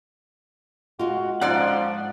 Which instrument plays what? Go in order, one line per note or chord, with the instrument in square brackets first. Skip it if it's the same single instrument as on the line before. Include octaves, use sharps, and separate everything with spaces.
[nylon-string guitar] G#3 F4 [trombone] F#4
[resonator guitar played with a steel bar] G#2 D5 [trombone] F3 [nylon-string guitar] C#4 [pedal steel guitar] F#5 F#6